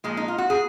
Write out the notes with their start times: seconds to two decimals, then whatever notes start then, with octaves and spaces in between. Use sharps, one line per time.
0.04 A#2 F3 G#3 G#4
0.17 D#4
0.28 F4
0.38 F#4
0.50 G#4